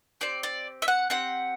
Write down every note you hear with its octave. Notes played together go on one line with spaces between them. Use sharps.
C4 G4 D5
D5
E5
F#5
C4 G4 F#5